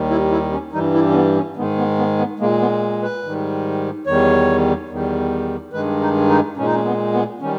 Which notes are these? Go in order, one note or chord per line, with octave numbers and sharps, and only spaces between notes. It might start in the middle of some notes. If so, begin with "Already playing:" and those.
Already playing: D#2 D#3 G3
E4
E4
C#4
G2 E3 G3 D#4
E4
C#4
B3
C#4
G#2 D#3 G#3 B3
B3
B3
B3
A#2 G#3 A#3
B3
B4
G#2 D#3 G3
E2 D#3 G3 C#5
E2 D#3 G3
G2 D#3 G#3 B4
D#4
D#4
A#2 G#3 C#4
D#4
C#4
B3
B3
D#3 G3 C#4